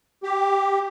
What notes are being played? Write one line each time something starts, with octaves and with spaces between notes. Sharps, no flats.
G4